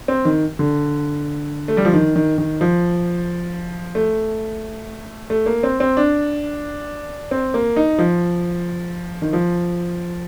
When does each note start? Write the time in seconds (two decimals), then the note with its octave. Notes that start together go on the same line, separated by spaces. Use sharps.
0.08 C4
0.25 D#3
0.59 D3
1.68 A3
1.77 G3
1.85 F3
1.94 D#3
2.16 D#3
2.38 D#3
2.61 F3
3.95 A3
5.30 A3
5.46 A#3
5.63 C4
5.80 C4
5.97 D4
7.31 C4
7.54 A#3
7.76 D#4
7.99 F3
9.22 D#3
9.33 F3